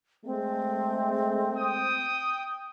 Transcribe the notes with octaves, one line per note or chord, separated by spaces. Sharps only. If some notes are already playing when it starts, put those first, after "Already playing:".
G#3 A3 C4
G5 D#6